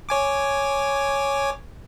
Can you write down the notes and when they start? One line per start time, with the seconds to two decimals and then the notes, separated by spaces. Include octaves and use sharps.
0.09 C#5 G#5 D6